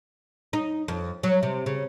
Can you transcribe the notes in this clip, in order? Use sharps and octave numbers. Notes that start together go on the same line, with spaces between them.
D#4
F2
F#3
C3
C#3